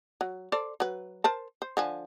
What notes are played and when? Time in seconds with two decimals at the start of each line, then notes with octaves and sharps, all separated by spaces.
0.21 F#3
0.52 A4 C5 D5
0.80 F#3 B4
1.24 A#4 C5 A5
1.62 C5
1.77 D3 F3 G#5